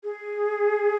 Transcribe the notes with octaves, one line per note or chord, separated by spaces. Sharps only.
G#4